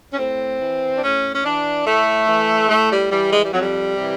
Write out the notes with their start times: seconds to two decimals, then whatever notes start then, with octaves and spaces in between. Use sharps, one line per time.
0.12 C#4
0.17 A2 C4
0.60 E3
0.96 D4
1.01 A2 C#4
1.33 C#4
1.43 E3 D4
1.85 A2 A3
2.28 E3
2.69 A2 A3
2.90 G3
3.11 E3 G3
3.32 G#3
3.42 G3
3.51 F2 F#3
3.60 G3
3.95 C3 E3